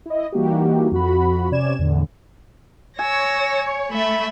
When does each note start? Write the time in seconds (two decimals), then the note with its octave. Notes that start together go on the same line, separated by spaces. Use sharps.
0.06 E4 D#5
0.32 E3 G3 A#3 D#4 F#4 G4
0.92 F2 F#4 B5
1.51 C3 C#4 D5 G#6 E7
1.79 E2 A2 D3
2.99 C#5 G#5 E6 A#6
3.93 A3 E5 B5